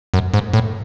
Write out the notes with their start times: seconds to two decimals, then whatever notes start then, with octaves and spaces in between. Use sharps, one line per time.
0.14 F#2
0.34 G#2
0.53 A2